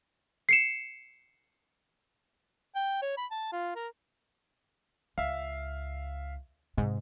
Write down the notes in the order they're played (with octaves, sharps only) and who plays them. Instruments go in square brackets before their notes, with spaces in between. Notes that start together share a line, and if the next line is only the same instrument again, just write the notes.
[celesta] C7 C#7 E7
[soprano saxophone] G5
C#5
B5
A5
F4
A#4
[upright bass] C#2 [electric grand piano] E5 F5
[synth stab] G#2 [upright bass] C3